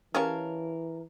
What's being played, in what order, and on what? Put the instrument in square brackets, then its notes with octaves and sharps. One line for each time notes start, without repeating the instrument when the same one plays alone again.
[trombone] E3 [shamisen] C#4 G4 G#4 [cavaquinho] A#4 [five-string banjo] C#5 F5 A5